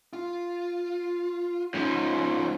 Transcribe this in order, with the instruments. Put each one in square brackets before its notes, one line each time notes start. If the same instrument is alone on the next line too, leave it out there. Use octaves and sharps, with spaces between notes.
[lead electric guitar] F4
[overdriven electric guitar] G#2 F3 [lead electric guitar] C#4